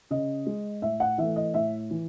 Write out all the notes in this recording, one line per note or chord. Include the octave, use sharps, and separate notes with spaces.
C#3 D#5
G#3
A2 E5
F#5
E3 A3 E5
D#5
A2 E5
E3